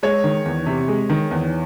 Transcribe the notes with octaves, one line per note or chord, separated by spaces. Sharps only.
G#3 C#5
D#3
E2
C3
G#3
D#3
E2